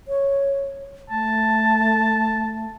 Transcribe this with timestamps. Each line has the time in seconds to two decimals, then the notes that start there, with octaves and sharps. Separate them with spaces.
0.08 C#5
1.10 A3 A5